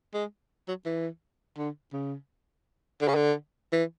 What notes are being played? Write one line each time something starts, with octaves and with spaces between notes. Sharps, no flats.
G#3
F#3
E3
D3
C#3
D3
C#3
D3
E3